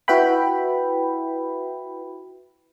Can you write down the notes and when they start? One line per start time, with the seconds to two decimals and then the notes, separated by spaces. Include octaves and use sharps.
0.08 E4 F#4 B4 E5 G5 B5